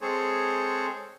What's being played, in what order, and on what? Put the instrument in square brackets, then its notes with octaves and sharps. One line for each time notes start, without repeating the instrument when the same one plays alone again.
[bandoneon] G#3 C4 G#4 A4 C5 C#5